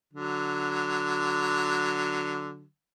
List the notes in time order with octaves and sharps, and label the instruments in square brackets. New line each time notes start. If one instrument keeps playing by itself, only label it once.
[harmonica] D3 F#3